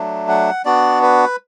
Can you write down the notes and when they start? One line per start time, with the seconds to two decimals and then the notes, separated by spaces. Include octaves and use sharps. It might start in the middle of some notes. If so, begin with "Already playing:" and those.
Already playing: F#3 A3 D4
0.29 F#5
0.65 B3 D4 F#4 D5
1.03 B4